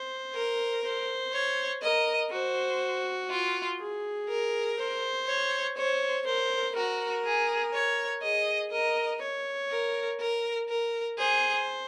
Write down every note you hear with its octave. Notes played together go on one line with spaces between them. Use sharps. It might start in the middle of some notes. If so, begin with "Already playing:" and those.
Already playing: C5
A#4
C5
C#5
A#4 D#5
F#4 C5
F4
G#4
A#4
C5
C#5
C5 C#5
A#4 C5
F#4 A#4
G#4
C#5
G#4 D#5
A#4 D#5
C#5
A#4
A#4
A#4
G#4 C5